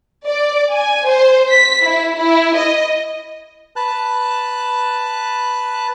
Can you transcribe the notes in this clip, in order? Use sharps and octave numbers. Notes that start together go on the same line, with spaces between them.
D5
G#5
C5
B6
E4
E4
D#5
B4 A5 F#6